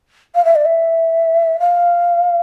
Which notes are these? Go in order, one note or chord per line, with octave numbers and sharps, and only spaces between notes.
F5
E5
D5
E5
F5